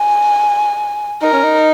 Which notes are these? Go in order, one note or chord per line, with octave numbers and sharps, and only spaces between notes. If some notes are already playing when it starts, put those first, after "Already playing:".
Already playing: G#5
D#4 A#4
C#4
D#4